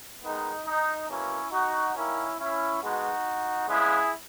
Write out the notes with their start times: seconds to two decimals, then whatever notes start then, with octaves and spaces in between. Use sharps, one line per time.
0.23 D#3 G#3 B3 D#4
0.66 D#4
1.09 B2 F#3 A#3 C#4 E4
1.52 D#4 F#4
1.95 D#3 A#3 C#4 E4
2.38 C#4 E4
2.81 B2 G#3 B3 D#4 F#4
3.68 C#3 G#3 B3 E4 G#4